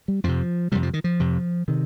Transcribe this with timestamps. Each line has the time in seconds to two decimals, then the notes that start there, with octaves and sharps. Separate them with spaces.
0.08 G3
0.24 F2 C3 F3
0.72 F2 C3 G3
0.83 F3
0.94 D#3
1.04 F3
1.20 F2 C3
1.68 C3 D#3